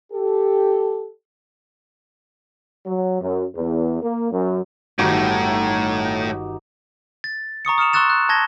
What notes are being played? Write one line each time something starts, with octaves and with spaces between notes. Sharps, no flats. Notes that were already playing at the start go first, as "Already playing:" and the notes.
G4 A4
F#3
F#2
E2
A#3
F#2
G1 A2 D#3 D#4 F#4 G4
A6
A#5 C#6 D#6 C#7
D#6 F6 C#7 E7 F7
C6 C#6 E6 F#6 A6 E7
F#6
A5 G#6 A#6 G7